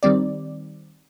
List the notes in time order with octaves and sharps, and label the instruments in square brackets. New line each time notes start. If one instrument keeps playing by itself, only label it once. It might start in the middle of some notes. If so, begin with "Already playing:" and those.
[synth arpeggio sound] D#3 G3 C4 D5